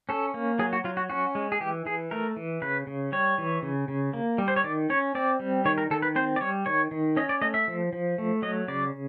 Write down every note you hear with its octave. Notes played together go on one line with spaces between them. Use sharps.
C#4 A4
A#3
F#3 G#4
F#4
F#3 F4
F#4
C#4 F#4
G#3
G#4
E3 G4
E3 G#4
A3 A#4
E3
C#3 B4
C#3
G3 C#5
E3
C#3
C#3
A#3
G3
C5
C#5
D#3 D5
C#4 C#5
C4 D5
G3
D#3 C#5
A#4
D#3 A4
B4
C4 C5
D5
G3 C#5
D#3 C#5
D#3
C#4 D#5
D5
A3 D#5
E5
F3
F3
A3
F#3 D#5
C#3 D5